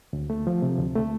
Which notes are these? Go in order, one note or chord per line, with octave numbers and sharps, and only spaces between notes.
D2
A3
F3
C3
D2
A3